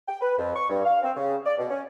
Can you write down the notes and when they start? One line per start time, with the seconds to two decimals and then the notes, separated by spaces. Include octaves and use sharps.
0.08 G5
0.21 B4
0.38 F2
0.55 C#6
0.69 G2
0.85 F5
1.03 C4
1.17 C#3
1.45 D5
1.58 B2
1.70 C#4